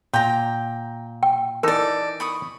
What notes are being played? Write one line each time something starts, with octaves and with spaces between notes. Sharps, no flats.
A#2 G5 A#5
G5
E3 D#4 A4 A#4 D5
B5 C#6 D#6